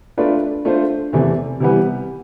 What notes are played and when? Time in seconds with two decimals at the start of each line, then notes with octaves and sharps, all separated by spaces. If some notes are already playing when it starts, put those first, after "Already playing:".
0.18 A3 D4 F4 B4 D5
0.65 A3 D4 F4 C5
1.13 E2 C3 E3 A3
1.60 C3 E3 G3 B3